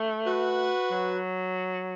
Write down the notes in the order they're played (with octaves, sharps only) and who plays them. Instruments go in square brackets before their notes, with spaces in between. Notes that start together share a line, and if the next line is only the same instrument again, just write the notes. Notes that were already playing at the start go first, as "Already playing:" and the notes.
Already playing: [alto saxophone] A3
[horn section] F#4 B4
[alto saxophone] F#3